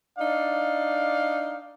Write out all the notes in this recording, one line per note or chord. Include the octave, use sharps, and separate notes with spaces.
D4 D#4 D5 F5